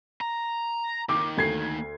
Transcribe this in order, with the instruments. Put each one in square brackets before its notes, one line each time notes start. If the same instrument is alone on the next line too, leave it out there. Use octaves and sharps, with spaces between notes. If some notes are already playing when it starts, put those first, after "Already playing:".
[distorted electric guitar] A#5
[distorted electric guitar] D#3 A#3 [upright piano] D6
[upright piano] D2 G#6 C7